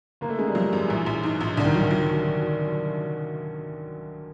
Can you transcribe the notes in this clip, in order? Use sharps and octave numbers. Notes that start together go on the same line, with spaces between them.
F#1 A#3
A3
C#3 G#3
G3
F3 F#3
F#2
A#1 E3
A#1
G#2
A#1
C2 D3
D#3
F#3
D#3
F#3